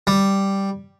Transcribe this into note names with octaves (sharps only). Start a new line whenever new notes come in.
G3